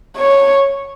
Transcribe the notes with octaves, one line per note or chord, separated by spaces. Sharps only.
C#5